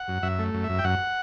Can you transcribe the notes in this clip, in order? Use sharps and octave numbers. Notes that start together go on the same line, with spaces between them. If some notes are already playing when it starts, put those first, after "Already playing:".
Already playing: F#5
F#2
F#2 E5
A3
F#2
E5
F#2
G5
F#2 F#5